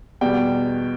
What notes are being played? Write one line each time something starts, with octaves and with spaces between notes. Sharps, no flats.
E2 B2 G3 G5